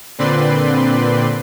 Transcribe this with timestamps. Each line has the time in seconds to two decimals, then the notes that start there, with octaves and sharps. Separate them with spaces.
0.18 A#2 D3 C4 B4 D5 C6